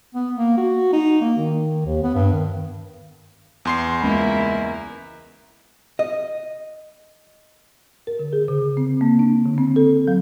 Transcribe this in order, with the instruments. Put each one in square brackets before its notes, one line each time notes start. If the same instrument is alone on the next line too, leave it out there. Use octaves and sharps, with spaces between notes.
[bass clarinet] B3
A#3
F#4
D#4
A#3
D#3
D#2
B3
G2
D#3
[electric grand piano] E2 C6 C7
[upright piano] C#2 B5 [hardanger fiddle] A#3 E4
[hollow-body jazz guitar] D#5
[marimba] A#4
D3
G#4
C#3
C4
A#3
D4
D3
C4
A4
F#3